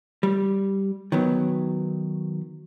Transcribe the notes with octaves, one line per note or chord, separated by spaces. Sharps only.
G3
D#3 F#3 B3